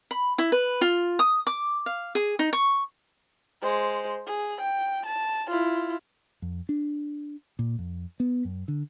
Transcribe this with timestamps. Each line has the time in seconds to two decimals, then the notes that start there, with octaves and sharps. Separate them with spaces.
0.11 B5
0.38 E4
0.52 B4
0.81 F4
1.19 D#6
1.47 D6
1.86 F5
2.15 G#4
2.39 D#4
2.53 C#6
3.62 G#3 C5
4.27 G#4
4.61 G5
5.06 A5
5.50 E4 F4
6.42 F2
6.69 D4
7.59 A#2
7.79 F2
8.20 B3
8.45 F#2
8.68 D3